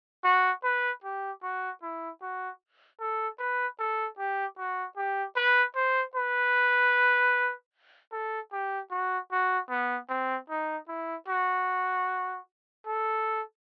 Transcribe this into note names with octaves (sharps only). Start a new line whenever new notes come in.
F#4
B4
G4
F#4
E4
F#4
A4
B4
A4
G4
F#4
G4
B4
C5
B4
A4
G4
F#4
F#4
B3
C4
D#4
E4
F#4
A4